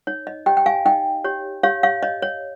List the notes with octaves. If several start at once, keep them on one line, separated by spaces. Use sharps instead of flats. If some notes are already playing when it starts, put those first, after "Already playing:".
D#4 C#5
D#5
G4 C#5 D#5 G5
G5
F5 G#5
D#4 D#5 G5
G4 C#5
G4 C#5 F5
C#5 F5
C#5 D#5
C#5